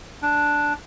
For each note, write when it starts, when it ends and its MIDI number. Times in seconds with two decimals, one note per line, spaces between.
0.22 0.73 62